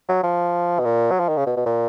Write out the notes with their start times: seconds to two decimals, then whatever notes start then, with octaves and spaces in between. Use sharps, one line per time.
0.09 F#3
0.23 F3
0.79 B2
0.85 A#2
1.11 F#3
1.20 F3
1.29 D#3
1.37 C#3
1.47 B2
1.57 B2
1.66 A#2